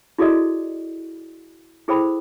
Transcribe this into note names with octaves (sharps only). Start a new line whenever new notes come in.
E4 F#4 G#4 A4 D5 D#5
E4 G#4 A4 C5 G5 B5